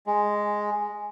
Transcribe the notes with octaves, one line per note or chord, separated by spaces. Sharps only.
G#3